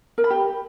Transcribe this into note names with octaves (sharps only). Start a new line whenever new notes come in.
A#4
B5
G4